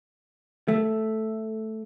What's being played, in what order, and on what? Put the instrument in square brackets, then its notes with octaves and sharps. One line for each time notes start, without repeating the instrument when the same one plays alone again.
[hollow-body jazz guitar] A3